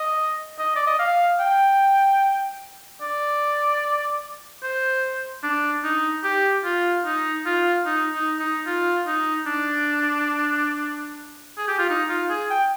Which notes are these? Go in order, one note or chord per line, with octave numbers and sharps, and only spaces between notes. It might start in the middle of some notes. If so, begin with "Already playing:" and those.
Already playing: D#5
D#5
D5
D#5
F5
G5
D5
C5
D4
D#4
G4
F4
D#4
F4
D#4
D#4
D#4
F4
D#4
D4
G#4
G4
F4
D#4
F4
G#4
G5